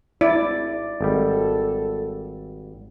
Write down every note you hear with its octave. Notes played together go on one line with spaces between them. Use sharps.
G#1 E4 D5
G#1 G3 A4